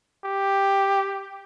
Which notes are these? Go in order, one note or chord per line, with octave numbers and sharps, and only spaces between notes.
G4